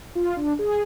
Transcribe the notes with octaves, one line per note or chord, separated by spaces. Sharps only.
F4
D4
G#4